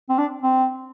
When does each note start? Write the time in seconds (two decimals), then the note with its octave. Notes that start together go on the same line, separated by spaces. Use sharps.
0.09 C4
0.18 D4
0.42 C4